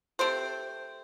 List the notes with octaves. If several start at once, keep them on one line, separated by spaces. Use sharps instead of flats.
A3 C4 G4 C5